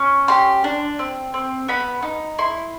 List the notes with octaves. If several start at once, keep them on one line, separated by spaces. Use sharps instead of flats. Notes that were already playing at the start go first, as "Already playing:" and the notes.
Already playing: C#4
G4 C6
D4
C4
C4
B3 B5
D#4
E4 C6